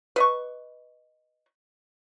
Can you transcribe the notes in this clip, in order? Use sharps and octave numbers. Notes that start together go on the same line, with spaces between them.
B4 D#5 C#6